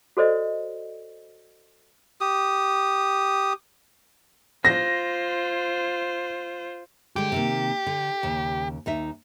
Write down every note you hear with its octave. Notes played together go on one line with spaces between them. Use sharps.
F#4 A4 C5 D5 D#5
G4 D#6
F4 C5 A#6
D3 G#3 G4
C3 D#3 A#3
D3
D#2 C#3
D#2 D#4 E5